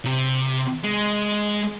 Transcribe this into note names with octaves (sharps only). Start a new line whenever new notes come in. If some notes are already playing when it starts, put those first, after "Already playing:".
C3
G#3